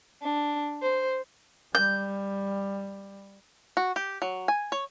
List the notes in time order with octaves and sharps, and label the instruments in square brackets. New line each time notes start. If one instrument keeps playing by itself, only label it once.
[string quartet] D4
C5
[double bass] G3 [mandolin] G6
[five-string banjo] F#4
G4
F#3
G#5
C#5